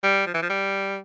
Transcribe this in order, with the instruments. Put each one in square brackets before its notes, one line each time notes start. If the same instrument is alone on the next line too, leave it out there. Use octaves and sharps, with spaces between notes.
[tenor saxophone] G3
F3
E3
F3
G3